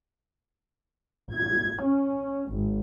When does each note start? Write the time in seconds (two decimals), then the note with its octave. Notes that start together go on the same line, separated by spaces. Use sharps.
1.33 G#6
1.82 C#4
2.51 G#1